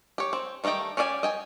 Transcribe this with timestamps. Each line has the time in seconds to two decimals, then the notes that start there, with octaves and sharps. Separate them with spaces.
0.18 G4 C#5
0.33 C4
0.64 D#3 G3 A3 D#5 G5
0.97 C#4 G4 D5 E5 G#5
1.23 D#5 G5 G#5